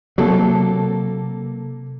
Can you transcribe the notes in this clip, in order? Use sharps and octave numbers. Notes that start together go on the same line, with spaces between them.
C3 F#3 A#3 A4